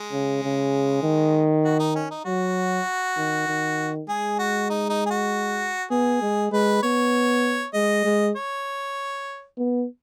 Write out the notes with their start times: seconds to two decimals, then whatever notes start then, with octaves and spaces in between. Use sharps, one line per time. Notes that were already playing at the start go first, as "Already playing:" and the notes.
Already playing: G#3
0.12 C#3
0.43 C#3
1.03 D#3
1.65 F#4
1.80 D#4
1.95 C#4
2.11 D#4
2.25 F#3 F#4
3.17 D#3
3.48 D#3
4.09 G#3 G#4
4.39 F#4
4.70 D#4
4.90 D#4
5.06 G#4
5.11 F#4
5.91 B3 G#4
6.22 G#3
6.52 G#3 B4
6.83 B3 C#5
7.74 G#3 D#5
8.05 G#3
8.36 C#5
9.58 B3